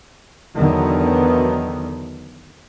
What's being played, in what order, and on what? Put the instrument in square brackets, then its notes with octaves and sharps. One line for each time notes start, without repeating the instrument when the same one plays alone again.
[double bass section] E2 D3 D#3 F#3 B3